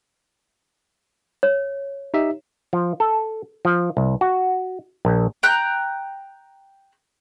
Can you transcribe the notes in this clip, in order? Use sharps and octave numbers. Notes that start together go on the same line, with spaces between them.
C#5
D#4 G4 E5
F3
A4
F3
C2
F#4
A#1
G5 A#5 F#6 G6